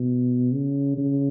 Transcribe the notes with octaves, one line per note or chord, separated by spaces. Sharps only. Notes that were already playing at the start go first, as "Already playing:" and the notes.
Already playing: B2
C#3
C#3